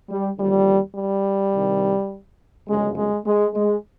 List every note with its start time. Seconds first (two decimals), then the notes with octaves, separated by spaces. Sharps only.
0.09 G3
0.38 D#2 D3 F3 G3
0.96 G3
1.53 C2 C3 D#3
2.68 G1 F#2 C#3 G#3
2.96 G#3
3.26 G#3
3.54 G#3